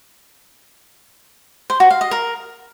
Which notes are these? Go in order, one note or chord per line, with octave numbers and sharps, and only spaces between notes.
C5
F#4
F5
D#5
A#4